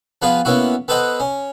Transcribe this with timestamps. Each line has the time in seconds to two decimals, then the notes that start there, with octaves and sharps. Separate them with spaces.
0.22 F3 B3 F4 G#4 B4 D#6
0.45 A#3 B3 C#4 E4 F#4
0.88 B3 A4 B4 C5 D#5 F#5
1.20 C#4